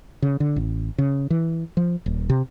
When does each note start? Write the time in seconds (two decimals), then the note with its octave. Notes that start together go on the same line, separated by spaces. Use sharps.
0.22 C#3
0.40 D3
0.56 A1
0.98 C#3
1.30 E3
1.77 F3
2.06 D#1
2.30 C3